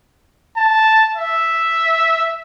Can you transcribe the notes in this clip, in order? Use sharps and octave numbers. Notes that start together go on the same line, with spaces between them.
A5
E5